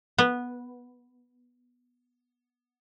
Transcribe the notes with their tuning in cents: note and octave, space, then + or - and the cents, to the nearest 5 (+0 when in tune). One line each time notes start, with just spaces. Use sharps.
B3 -10